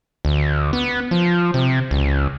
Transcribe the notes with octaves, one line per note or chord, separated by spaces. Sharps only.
D2
B3
F3
C3
C#2